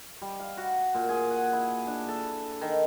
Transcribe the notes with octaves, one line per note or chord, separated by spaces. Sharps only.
G3
F5
F#4
A#2
G#4
F#5
E4
D4
A4
D#3